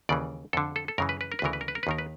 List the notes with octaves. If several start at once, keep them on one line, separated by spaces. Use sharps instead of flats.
D#2 C#3 E3 D5
F2 D3 A4
A4
A4
F#2 C#3 E3 A#4
B4
B4
A#4
B4
D2 C#3 E3 A#4
B4
A#4
B4
A#4
B4
D#2 D#3 A#4
B4